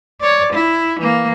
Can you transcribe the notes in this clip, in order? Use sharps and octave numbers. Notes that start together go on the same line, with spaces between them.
C#5 D5
E4
E3 A#3